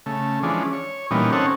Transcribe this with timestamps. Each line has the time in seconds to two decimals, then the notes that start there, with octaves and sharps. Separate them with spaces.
0.06 C#3 A3
0.43 E3 F3 G#3 C#4 D4
0.73 C#5
1.11 A#2 E3 G3 B3 C#4 D#4
1.32 C4 C#4 D#4 A4 C#5 F#5